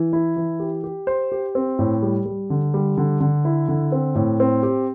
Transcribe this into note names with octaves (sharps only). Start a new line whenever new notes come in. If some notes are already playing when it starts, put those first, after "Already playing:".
Already playing: E3
E4
E3
G4
G4
C5
G4
C4
A2
G3
G3
D3
G3
D3
D3
E4
D3
C4
A2
C4
G4